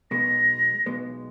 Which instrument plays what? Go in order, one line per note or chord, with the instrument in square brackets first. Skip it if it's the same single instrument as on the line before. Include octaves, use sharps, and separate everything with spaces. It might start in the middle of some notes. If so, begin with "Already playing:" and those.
[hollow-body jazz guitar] B1 B2 G#3 B3 [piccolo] A#6
[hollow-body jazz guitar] B1 B2 G#3 B3